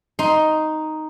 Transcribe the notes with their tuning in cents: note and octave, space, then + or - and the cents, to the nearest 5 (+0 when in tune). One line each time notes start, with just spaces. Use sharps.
D#4 +0 C6 +0